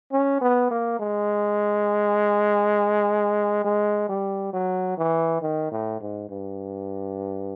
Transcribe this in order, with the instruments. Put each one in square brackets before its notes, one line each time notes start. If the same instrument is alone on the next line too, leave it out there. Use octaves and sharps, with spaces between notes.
[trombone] C#4
B3
A#3
G#3
G#3
G3
F#3
E3
D#3
A2
G#2
G2